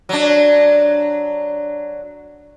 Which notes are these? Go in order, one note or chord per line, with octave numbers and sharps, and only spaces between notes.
F#3 D4